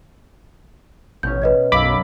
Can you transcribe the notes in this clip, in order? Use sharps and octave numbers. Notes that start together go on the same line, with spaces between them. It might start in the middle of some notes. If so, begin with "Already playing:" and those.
A1 B2 C#4 G6
B4 D#5 G#6
B1 F#2 D#5 F5 B5 D6 E6